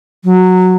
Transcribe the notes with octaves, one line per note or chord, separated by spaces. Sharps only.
F#3